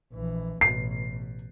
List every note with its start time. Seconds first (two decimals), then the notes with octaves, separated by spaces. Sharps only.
0.13 A#1 E3
0.61 A1 B2 C7